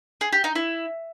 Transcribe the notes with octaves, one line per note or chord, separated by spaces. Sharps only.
G#4
G4
D#4
E4